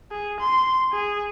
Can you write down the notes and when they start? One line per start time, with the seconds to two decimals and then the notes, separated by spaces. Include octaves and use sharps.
0.11 G#4
0.40 C6
0.92 G#4